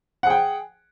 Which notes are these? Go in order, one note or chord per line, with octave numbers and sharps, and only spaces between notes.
G#4 F#5 G5